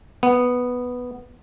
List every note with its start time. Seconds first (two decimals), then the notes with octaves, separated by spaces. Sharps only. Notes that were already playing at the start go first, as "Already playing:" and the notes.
0.23 B3